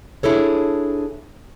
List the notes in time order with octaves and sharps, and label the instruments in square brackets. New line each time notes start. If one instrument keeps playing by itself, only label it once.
[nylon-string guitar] D4 E4 G#4 A4 C#5